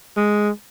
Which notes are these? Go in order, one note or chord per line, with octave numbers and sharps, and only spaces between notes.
G#3